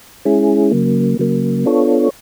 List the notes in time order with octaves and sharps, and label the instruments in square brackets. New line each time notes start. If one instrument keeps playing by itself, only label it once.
[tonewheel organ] G#3 C#4 E4 G#4
C#3 F#3 A#3
C#3 F#3 A#3
B3 D4 F4 A4 C#5